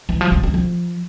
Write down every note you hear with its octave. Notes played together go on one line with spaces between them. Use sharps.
E3
F3
G3
G3
F3